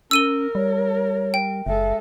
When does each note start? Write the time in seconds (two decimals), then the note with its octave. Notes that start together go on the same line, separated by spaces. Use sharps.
0.11 C#4 A#4 E6 D#7 G7
0.55 G3 C#5
1.34 G5
1.67 F#1 G#3 A4 E5